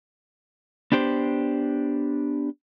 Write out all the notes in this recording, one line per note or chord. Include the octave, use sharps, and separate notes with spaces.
B3 D4 G4 C5